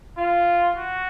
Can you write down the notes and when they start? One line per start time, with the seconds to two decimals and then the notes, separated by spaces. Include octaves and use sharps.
0.17 F4
0.76 F#4